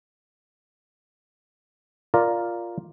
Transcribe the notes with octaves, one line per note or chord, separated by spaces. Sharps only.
F4 A#4 D5